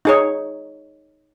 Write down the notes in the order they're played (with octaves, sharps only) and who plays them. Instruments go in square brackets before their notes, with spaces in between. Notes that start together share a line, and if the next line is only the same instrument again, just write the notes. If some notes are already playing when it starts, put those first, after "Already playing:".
[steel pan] D#4 G#4 C#5